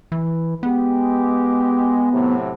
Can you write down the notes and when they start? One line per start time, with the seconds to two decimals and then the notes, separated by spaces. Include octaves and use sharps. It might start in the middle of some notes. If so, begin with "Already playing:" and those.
0.12 E3
0.63 G#3 B3 G4
2.12 A2 C3 F#3